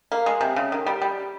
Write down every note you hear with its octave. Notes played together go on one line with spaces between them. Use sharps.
A#3
G#3
C3
C#3
D#3
G3
G3